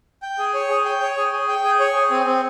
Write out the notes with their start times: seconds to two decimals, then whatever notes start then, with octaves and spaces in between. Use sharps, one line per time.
0.22 G5
0.38 G#4
0.54 C#5
0.70 G#4
0.85 G5
1.01 C#5
1.17 G#4
1.32 G#4
1.48 G5
1.64 G#4
1.80 C#5
1.95 G#4
2.11 C4
2.26 C4